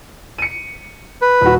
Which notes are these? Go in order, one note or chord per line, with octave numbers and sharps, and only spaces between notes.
C#7 D#7
B4
D#1 F#4